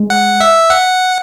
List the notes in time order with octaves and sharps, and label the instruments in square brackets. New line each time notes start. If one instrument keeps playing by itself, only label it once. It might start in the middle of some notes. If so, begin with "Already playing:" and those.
Already playing: [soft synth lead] G#3
[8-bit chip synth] F#5
E5
F#5